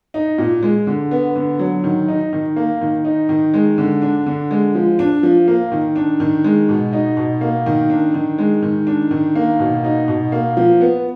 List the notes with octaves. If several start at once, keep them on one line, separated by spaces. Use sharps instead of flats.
D#4
A#2
G#3
D3
B3
D3
F#3
D#3
D#4
D#3
A#3
D#3
D#4
D#3
G#3
D3
D4
D3
G#3
F3
D4
F3
A#3
D#3
D4
D#3
G#3
B2
D#4
B2
A#3
D#3
D4
D#3
G#3
D#3
D4
D#3
A#3
B2
D#4
B2
A#3
F3
B3